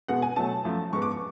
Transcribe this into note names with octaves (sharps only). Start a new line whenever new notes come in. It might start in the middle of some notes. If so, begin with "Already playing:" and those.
B2 G#3 B3 F#5
G#5
B2 F#3 A3 A5
F#2 F3 A3
G#2 G#3 B3 C#6
D6
C#6